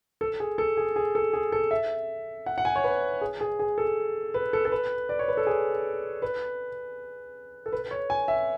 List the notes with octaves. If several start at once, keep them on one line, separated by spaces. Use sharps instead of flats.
A4
G#4
A4
G#4
G#4
A4
G#4
A4
E5
F#5
F#5
G#5
C#5
B4
G#4
G#4
G#4
A4
B4
A4
A4
B4
D5
C#5
B4
A4
G#4
B4
A4
B4
C#5
G#5
E5